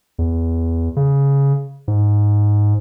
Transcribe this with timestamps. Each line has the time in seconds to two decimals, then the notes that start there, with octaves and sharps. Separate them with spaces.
0.19 E2
0.97 C#3
1.88 G#2